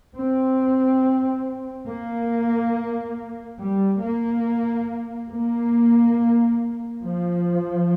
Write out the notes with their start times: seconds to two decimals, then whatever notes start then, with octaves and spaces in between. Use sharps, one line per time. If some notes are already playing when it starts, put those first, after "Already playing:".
0.16 C4
1.88 A#3
3.59 G3
4.02 A#3
5.31 A#3
7.02 F3